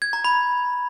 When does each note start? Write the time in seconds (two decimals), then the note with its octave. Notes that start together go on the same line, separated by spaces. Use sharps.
0.02 G#6
0.13 A#5
0.24 B5